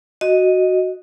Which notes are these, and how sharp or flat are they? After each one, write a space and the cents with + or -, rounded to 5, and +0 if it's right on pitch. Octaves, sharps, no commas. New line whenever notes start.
F#4 +0 D#5 +0